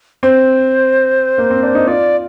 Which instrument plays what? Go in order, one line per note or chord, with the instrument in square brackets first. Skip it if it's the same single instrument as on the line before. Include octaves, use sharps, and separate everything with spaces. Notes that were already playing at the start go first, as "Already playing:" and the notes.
[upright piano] C4 [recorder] C5
[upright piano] A#3
C4
D4
D#4
[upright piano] F4 [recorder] D5